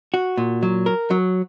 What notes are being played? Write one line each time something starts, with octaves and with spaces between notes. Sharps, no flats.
F#4
A#2
F#3
A#4
F#3